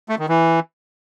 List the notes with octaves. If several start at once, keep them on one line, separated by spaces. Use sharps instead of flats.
A3
D#3
E3